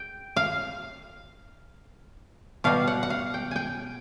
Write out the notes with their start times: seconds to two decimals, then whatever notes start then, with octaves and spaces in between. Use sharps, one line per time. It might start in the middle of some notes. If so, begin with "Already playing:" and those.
Already playing: G5
0.36 F5
2.64 B2 G3 F5
2.87 F#5
3.03 F#5
3.10 F5
3.34 G5
3.51 G5 G#5